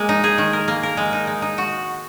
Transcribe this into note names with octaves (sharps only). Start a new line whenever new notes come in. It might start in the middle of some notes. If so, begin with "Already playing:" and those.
Already playing: G#3 A#3
D#4
G#4
D#3
A#4
A#3
A#4
G#3
D#4
G#3
D#4
F#4